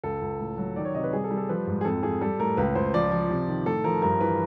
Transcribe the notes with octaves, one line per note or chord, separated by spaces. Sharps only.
C#2 A4
C#2
A2
F#3
D#3 D5
C#5
C3 D#5
B4
G3 G#4
A4
G3
A4
F3 B4
G#2
G#4
F2 A4
F2 G#4
G3 A4
A2 A#4
C#2 B4
C#2 C5
F3 D5
F3
C3
D#3
A2 A4
F3 A#4
G2 A#4
E3 B4